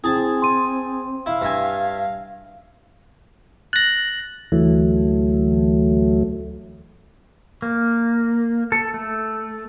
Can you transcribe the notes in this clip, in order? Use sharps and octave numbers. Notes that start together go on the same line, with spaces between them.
C4 E4 G#4 G5 A5
C6 D#7
E4 F5
G2 E5 G#5
F#6 A6 A#6 F#7
D2 E3 F#3 A3
A#3
A4
A3